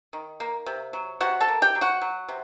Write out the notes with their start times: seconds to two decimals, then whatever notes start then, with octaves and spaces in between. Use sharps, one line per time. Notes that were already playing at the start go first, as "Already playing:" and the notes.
0.13 D#3
0.40 A#3
0.66 C3
0.93 F#3
1.20 C3 F#4 F#5
1.40 A4 A5
1.48 A#3
1.62 G4 G5
1.75 F#3
1.81 F#4 F#5
2.01 F#3
2.28 C3